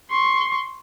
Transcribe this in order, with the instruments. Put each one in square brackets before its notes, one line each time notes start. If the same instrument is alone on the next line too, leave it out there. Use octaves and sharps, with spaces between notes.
[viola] C6 C#6